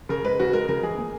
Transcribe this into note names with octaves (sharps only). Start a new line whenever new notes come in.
C#3 A#4
G#3 B4
C#3 F#4
G#3 A#4
C#3 A#4
E3 G#3 G#4
A#2